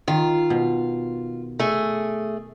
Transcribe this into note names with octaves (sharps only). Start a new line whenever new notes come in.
D#3 F4
B2
A3 G#4